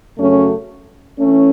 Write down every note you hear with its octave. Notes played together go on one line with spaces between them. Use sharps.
F#2 C#3 F#3 A3 C#4
E3 A3 C#4